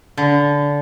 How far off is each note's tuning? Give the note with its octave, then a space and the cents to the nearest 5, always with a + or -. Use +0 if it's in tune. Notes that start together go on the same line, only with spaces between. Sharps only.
D3 -20